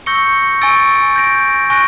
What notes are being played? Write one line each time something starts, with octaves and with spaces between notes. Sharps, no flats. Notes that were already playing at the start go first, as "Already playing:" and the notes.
C#6 E6 G6 A#6 C#7
G#5 C#6 E6 A6 D7
G6 A#6 D7
G#5 C#6 F#6 A#6 D7